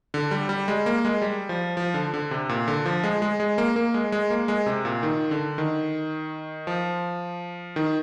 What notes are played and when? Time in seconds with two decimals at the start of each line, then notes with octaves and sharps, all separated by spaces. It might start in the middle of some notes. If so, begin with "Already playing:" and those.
0.14 D3
0.31 G3
0.49 G3
0.68 G#3
0.86 A#3
1.05 G#3
1.22 G3
1.49 F3
1.77 F3
1.94 D3
2.14 D3
2.31 C3
2.49 A#2
2.68 D3
2.86 F3
3.04 G#3
3.22 G#3
3.40 G#3
3.58 A#3
3.76 A#3
3.94 G#3
4.12 G#3
4.30 A#3
4.48 G#3
4.66 C3
4.85 A#2
5.03 D#3
5.31 D3
5.58 D#3
6.67 F3
7.76 D#3